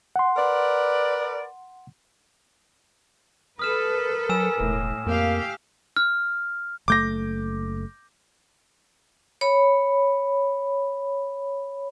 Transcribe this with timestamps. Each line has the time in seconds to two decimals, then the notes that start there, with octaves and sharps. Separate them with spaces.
0.16 F#5 C6
0.37 A#4 B4 D5
3.59 A4 B4 D#6 F6 E7
3.92 A#4
4.29 F#3 G#5 E6 E7
4.60 E1 A2
5.06 F2 A#3 G4 F5
5.96 F6
6.88 F#1 A3 D6 G6 A#6
9.41 C#5 B5